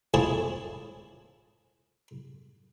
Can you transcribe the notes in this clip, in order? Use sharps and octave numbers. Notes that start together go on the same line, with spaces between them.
E4 F4 G#4 A4 C5 C#5